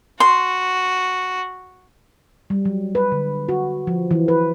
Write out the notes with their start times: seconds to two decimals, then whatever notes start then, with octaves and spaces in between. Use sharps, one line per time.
0.20 F#4 C6
2.50 G3
2.65 F#3
2.95 B4
3.12 D3
3.49 F#4
3.87 F3
4.11 E3
4.28 B4